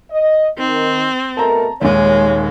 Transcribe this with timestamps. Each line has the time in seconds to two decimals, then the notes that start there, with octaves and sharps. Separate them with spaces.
0.11 D#5
0.58 D#3 C4
1.37 B2 A3 A#4 A5 A#5
1.81 D#1 D#2 G#3 C#5